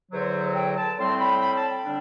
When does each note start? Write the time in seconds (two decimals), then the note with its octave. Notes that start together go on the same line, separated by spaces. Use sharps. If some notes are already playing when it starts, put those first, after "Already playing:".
0.12 E2 D3 F#3 C5
0.55 G5
0.77 A5
0.98 A2 G3 C4 C6
1.20 B5
1.41 B5
1.56 A5
1.70 G5
1.85 D3 G3 D4